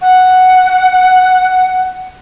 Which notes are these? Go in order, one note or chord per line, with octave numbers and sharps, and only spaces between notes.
F#5